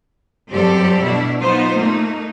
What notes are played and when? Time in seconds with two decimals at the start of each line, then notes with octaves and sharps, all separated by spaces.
0.50 F#2 G3 C4 G4 A4 D5
1.02 B2 D4 E4
1.40 F#3 B3 D#4 F4 C5
1.76 A3 A#3 D#4